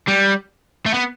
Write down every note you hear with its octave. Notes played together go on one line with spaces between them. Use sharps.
G3
A3
B3